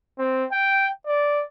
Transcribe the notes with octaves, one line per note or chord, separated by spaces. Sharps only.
C4
G5
D5